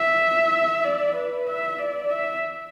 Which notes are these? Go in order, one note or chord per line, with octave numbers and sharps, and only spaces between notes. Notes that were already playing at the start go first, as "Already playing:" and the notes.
Already playing: E5
D5
B4
E5
D5
E5